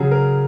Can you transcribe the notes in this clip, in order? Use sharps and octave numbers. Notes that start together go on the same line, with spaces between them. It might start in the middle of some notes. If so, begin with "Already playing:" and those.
Already playing: C#3 F#3 G#4
A#4